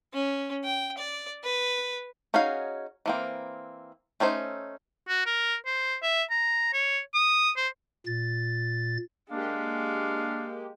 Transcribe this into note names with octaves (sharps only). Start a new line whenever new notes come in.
C#4
G5
D5
B4
C#4 D#4 F#4 G#4 F5
E3 A#3 C4
A3 C#4 D#4 C5
F#4
A#4
C5
E5
A#5
C#5
D#6
C5
A#2 A6
G#3 A#3 D4 G4 F5